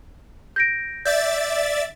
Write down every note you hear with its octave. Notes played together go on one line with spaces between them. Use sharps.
G6 A#6 D7
D5 E5 G6 A6